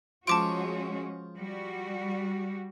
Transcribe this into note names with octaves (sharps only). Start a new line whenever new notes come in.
F3 G#3 C#4 F4 F#4 A5 D6 D7
G3 F#4